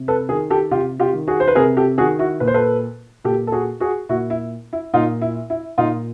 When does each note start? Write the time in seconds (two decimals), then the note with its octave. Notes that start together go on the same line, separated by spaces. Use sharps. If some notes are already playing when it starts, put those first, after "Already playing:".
Already playing: C3
0.08 A4 B4
0.29 D#3 G#4 A#4
0.50 G4 A4
0.71 C3 F4 G4
1.00 F4 G4
1.13 D#3
1.27 F#4 G#4
1.40 C5
1.48 B4
1.55 C3 G#4 A#4
1.77 G4 A4
1.98 D#3 F#4 G#4
2.19 E4 F#4
2.40 A#2 B4
2.47 C5
2.54 A4 B4
3.24 A#2 G4 A4
3.47 A4
3.52 F#4 G#4
3.80 F#4 G#4
4.09 A#2 E4 F#4
4.30 E4
4.73 E4
4.94 A#2 D#4 F4
5.21 E4
5.50 E4
5.78 A#2 D#4 F4